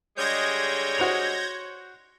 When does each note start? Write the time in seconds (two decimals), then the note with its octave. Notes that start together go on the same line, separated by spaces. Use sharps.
0.17 D3 G3 G#3 C#5 G6 G#6 A#6
0.98 F#4 C5 F7